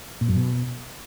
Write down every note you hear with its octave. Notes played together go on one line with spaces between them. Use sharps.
A#2
F#2
B2